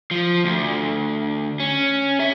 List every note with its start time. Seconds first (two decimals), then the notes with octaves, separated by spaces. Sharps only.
0.11 F3
0.45 D2
1.60 C#4
2.20 G4 E5